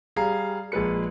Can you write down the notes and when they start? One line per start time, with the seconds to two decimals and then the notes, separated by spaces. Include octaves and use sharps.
0.16 G3 G#4 F5 A#5 C7
0.72 A#1 G#3 B4 C#7